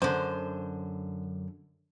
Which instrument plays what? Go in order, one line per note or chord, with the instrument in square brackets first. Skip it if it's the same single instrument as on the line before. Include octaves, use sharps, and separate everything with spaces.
[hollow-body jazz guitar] F#2 D3 [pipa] C5